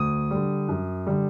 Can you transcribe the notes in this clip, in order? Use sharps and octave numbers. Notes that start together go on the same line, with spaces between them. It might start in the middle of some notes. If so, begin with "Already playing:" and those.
Already playing: D2 D#6
D3 G3
F#2
D3 G3